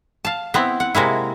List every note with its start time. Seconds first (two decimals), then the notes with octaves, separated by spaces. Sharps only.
0.25 F5 A5
0.54 B3 C4 E4
0.80 F#5
0.95 C3 G#3 A#3 E4